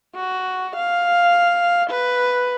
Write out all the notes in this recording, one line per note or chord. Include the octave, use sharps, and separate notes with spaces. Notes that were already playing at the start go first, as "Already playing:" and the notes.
F#4
F5
B4